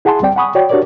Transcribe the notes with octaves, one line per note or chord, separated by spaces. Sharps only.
E4 G#4 F#5 G#5 A5 C6
D2 G3 C4 D5 G5
F#5 G#5 B5 C#6 D#6
F#4 C#5 D5 G5
D4 F#4 G4 A#4 C#5 D5